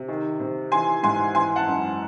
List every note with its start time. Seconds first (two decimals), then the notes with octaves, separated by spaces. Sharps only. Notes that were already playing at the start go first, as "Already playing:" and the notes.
Already playing: C3
0.08 D#3
0.40 C3
0.72 E3 G#5 C6
1.03 G#2 G#5 C6
1.35 E3 G#5 C6
1.56 F#5 A5
1.67 F#2